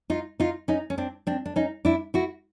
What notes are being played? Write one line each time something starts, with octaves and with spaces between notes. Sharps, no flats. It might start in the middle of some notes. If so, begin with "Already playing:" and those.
D#4 F4
D#4 F4
C#4 D#4
C#4
C4 D4
C4 D4
D4
C#4 D#4
D4 E4
E4 F#4